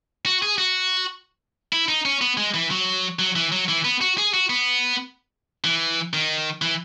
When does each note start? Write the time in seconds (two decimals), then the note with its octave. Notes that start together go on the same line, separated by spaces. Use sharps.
0.26 F#4
0.43 G#4
0.58 F#4
1.73 E4
1.88 D#4
2.06 C#4
2.21 B3
2.37 G#3
2.54 E3
2.71 F#3
3.19 F#3
3.36 E3
3.52 F#3
3.69 E3
3.85 B3
4.01 F#4
4.18 G#4
4.34 F#4
4.50 B3
5.64 E3
6.13 D#3
6.62 E3